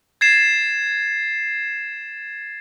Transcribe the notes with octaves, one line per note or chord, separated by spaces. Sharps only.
G#6 A6 C7 E7